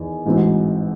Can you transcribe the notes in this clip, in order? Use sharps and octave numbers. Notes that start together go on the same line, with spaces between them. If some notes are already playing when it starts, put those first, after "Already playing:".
Already playing: E2 D#3
A1 G#2 E3 C4 F#4